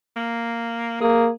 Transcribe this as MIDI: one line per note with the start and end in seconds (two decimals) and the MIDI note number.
0.16 0.99 58
1.01 1.30 58
1.01 1.27 68